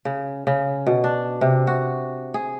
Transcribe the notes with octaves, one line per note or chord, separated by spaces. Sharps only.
C#3
C#3
B2
D4
C3
F#4
G#4